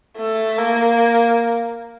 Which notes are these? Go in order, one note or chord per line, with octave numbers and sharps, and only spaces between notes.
A3
A#3